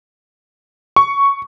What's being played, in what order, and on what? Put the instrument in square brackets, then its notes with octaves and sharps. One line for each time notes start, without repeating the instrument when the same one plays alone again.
[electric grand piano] C#6